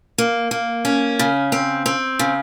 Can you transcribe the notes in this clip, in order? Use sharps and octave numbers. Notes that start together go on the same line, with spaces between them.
A#3
A#3
C#4
C#3
C4
C4
C#3